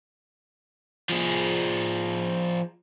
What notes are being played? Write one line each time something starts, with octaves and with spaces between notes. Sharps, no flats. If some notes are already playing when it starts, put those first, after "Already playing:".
F3 G#4